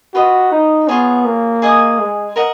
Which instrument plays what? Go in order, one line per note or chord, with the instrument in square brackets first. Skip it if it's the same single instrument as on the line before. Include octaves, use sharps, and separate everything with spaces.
[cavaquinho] F4 B4 D#5 [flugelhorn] F#4
[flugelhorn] D#4
[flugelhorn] B3 [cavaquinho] F4 G#4 C#5
[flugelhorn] A#3
[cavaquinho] G#4 D#5 G#5 D#6
[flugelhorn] G#3
[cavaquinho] A#4 D#5 F#5 A#5